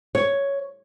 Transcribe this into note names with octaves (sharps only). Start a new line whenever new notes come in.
C#5